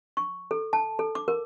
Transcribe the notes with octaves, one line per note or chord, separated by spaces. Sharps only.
C#6
A4
A5
A4
D6
A#4